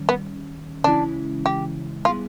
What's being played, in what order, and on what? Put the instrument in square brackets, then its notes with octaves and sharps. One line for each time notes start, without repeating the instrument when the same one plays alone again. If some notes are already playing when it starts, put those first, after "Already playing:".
Already playing: [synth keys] D#3 G3 C#4
[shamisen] B3
[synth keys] C#3 E3 G#3 C#4 E4 [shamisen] D4
[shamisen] G4
[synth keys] G3 B3 E4 G#4 [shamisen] F4